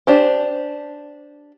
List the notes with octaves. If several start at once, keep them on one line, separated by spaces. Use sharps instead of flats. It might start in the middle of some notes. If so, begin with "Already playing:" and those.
D4 G4 C5